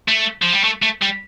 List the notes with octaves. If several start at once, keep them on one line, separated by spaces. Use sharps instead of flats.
A3
F3
G3
A3
A3
G3